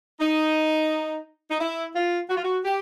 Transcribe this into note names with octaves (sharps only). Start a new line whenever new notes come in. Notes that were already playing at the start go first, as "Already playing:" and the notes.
D#4
D#4
E4
F4
F#4
F4
F#4
G4